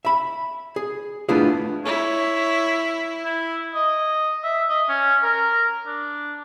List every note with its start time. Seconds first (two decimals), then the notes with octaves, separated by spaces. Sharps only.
0.05 E5 B5
0.76 G#4
1.29 A3 B3 D4 E4 F4 G#4
1.85 E4 C#5
3.25 E4
3.74 D#5
4.44 E5
4.69 D#5
4.89 C#4
5.23 A#4
5.86 D4